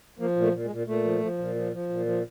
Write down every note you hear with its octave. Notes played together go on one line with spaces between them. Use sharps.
F3 A#3
A#2
A3
A#2
G#3
A#2
A#2 A3
F3
F3
A#2
F3
F3
A#2
F3